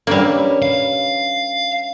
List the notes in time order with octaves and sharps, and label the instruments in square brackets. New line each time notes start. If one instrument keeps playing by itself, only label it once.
[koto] G3 A#3 [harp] C#4 D4 B4
[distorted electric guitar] F5